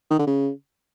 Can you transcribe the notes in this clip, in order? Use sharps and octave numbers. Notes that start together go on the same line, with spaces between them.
D#3
D3
C#3